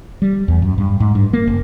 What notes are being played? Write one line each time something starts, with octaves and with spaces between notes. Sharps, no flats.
G3
E2
F#2
G2
G#2
G2
A#3
F#1